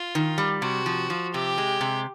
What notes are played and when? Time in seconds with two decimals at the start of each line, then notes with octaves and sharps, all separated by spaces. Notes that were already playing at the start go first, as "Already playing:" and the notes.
Already playing: F4
0.15 D#3
0.38 G3
0.62 C3 F#4
0.86 F3
1.10 F3
1.34 C3 G4
1.58 G#3
1.81 C3